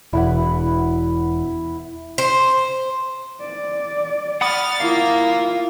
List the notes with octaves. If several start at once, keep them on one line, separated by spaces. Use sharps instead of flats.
E1 E4 B4 F#5
C5
D5
F#5 B5 D#6 F6 A6
A#3 E4 F4 F5